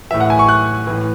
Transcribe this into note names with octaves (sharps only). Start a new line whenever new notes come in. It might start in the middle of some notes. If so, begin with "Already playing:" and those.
A2 E3 E5
F#5
G#5
C#6
F#6
A2 E3